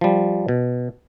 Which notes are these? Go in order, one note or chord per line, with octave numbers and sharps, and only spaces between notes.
F3 G3
B2